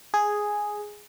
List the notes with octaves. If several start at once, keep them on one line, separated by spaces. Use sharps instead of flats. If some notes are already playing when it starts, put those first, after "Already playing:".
G#4